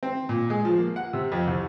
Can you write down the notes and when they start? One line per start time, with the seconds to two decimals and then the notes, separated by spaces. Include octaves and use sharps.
0.03 C4
0.29 A#2
0.50 G#3
0.65 F3
0.78 A#3
0.96 F#5
1.13 C3
1.32 F2
1.47 C2